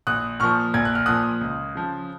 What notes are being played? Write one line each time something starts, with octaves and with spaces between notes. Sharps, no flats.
A#1 D#6 F#6
A#2 F3 C#6 F6
A#1 G#6
F#6
F6
A#2 F3 D#6 F#6
C#2
C#3 F3